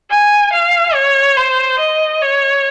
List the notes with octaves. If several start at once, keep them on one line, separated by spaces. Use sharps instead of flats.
G#5
F5
C#5
C5
D#5
C#5